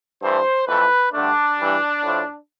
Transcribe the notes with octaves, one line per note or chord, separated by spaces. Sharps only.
G2 E3 A3 C5
F2 E3 A3 B4
G2 D3 A3 D4
G2 E3 G3
A2 F3 A3